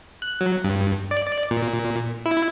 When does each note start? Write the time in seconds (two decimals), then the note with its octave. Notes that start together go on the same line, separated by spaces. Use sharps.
0.22 F#6
0.41 F#3
0.64 G2
1.11 D5
1.26 D5
1.51 A#2
2.26 E4